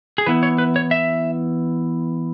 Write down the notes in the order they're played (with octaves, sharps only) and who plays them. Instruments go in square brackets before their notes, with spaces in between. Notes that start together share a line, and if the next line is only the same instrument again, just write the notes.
[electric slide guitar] G#4
E3 B3 E4 B4
C#5
B4
C#5
E5